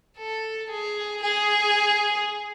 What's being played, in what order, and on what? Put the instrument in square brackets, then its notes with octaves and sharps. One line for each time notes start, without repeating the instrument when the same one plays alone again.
[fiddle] A4
G#4
G#4